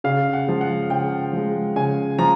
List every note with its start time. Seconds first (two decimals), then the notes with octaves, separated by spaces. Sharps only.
0.04 C#3 F5
0.33 F#5
0.47 F3 G#3
0.61 F#5
0.90 C#3 G5
1.33 F3 G#3
1.76 C#3 G#5
2.19 F3 A#5